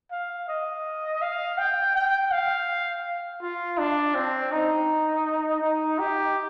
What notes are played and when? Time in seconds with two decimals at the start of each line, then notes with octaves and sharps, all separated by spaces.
0.12 F5
0.48 D#5
1.21 F5
1.58 G5
1.95 G5
2.32 F5
3.42 F4
3.78 D4
4.15 C4
4.52 D#4
5.62 D#4
5.99 G4